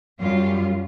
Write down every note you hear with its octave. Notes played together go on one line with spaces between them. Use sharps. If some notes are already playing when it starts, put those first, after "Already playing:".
F#2 G3 F4